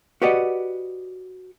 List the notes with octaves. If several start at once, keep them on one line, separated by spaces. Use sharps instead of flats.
F#4 G4 B4 D5 D#5 F#5